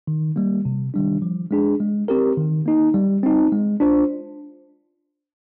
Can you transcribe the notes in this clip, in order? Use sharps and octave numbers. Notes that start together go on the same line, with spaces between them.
D#3
G3 A#3
C3
D#3 G3 D4
F3
G#3 D4 G#4
G#3
C4 G4 A#4
D#3
A#3 D#4
G3
C4 D#4
G#3
D4 F4 C5